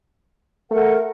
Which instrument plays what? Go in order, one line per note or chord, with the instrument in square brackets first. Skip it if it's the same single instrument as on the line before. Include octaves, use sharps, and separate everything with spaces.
[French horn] A3 [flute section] A#4 F#5